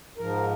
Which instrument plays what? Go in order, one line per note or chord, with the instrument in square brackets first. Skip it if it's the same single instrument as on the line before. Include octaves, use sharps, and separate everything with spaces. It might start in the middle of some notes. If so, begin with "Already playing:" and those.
[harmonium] G#2 F3 A#4